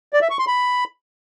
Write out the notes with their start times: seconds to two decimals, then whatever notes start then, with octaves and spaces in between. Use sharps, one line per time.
0.13 D5
0.22 E5
0.30 C#6
0.39 C6
0.47 B5